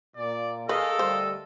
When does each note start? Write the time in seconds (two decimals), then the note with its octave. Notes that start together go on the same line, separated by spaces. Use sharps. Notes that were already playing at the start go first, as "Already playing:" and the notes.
0.17 A#2 D5
0.69 D#3 G#4 A4 B4 D#5 F5
0.99 D2 G3 C5